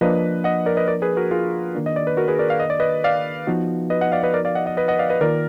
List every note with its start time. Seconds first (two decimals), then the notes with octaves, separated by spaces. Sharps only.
0.01 F3 A#3 D4 B4 D#5
0.44 D#5 F#5
0.66 A#4 D5
0.77 B4 D#5
0.88 A#4 D5
1.02 G#4 B4
1.17 F#4 A#4
1.31 F4 G#4
1.75 D#3 A#3 D4
1.86 D#5
1.96 D5
2.07 B4
2.17 F#4 A#4
2.28 G#4 B4
2.39 A#4 D5
2.50 F5
2.60 D#5
2.70 D5
2.80 B4 D#5
3.04 D5 F5
3.47 F3 B3 D#4 F#4
3.90 B4 D#5
4.01 D#5 F#5
4.12 D5 F5
4.23 B4 D#5
4.34 A#4 D5
4.45 D5 F5
4.55 D#5 F#5
4.66 D#5 F#5
4.77 B4 D#5
4.88 D#5 F#5
4.99 D5 F5
5.10 B4 D#5
5.21 D#3 A#3 F4 A#4 D5